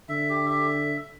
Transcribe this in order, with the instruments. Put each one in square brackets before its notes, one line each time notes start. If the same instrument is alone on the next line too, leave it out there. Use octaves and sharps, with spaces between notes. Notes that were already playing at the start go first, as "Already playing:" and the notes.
[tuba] D3 [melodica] E5
[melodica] G4
E5